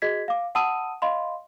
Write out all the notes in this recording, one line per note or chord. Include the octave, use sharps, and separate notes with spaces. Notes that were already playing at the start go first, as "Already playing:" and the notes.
F#4 G#4 D#5 G#6 B6
F5 D6
F#5 A5 B5 D#6 E6 D#7
D#5 F5 B5 C6